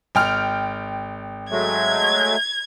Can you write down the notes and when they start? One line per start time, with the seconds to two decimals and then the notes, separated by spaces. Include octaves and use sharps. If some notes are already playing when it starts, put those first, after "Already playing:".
0.15 G#1 G5 F6
1.51 F#3 G#3 A3 G#6